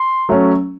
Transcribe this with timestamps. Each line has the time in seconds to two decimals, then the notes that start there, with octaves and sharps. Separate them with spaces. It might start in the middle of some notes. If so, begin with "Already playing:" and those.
Already playing: C6
0.29 F#3 A3 C#4